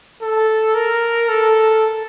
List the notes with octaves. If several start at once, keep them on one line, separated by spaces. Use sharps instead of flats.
A4
A#4
A4